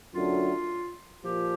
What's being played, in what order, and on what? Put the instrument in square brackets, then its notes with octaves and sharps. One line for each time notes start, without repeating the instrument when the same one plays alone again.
[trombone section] F#2 D3 F#3 A3 D4 [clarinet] F4
[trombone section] A#2 F3 [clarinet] G4